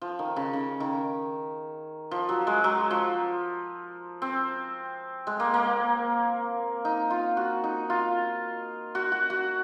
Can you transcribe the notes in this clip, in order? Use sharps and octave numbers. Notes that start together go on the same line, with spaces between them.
F3
D#3
C#3
C#3
D#3
F3
F#3
G#3
F#3
F3
C4
G#3
A#3
A#3
D#4
F4
F#4
D#4
F4
F#4
F#4
F#4